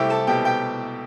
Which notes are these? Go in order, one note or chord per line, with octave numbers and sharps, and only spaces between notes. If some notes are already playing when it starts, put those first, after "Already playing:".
Already playing: C2 A3 E4 G4 E5 G5
A4 A5
B2 G4 G5
G4 G5